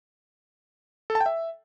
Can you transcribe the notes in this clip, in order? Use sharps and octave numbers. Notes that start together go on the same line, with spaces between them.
A4
A5
G5
E5